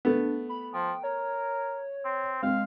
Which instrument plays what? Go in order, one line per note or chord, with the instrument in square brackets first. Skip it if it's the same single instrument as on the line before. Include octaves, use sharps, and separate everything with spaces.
[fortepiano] A3 B3 [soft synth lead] D4
[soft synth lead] B5
[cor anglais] F3 [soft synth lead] G5
[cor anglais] A#4 [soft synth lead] C#5
[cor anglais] C4
[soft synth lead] G#3 [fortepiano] C4 [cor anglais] F5